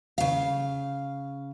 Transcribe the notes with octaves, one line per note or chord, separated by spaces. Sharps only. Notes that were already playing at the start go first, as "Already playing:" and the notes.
C#3 F5